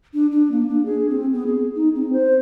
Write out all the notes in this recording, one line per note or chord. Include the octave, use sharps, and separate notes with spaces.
D4
D4
A#3
D4
G#4
C4
B3
G#4
D#4
C4
C5